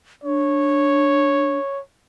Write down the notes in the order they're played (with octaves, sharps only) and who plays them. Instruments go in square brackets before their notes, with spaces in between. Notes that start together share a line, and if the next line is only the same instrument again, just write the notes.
[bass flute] D4 [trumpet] C#5